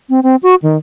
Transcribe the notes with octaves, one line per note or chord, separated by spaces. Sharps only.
C4
C4
F#4
D#3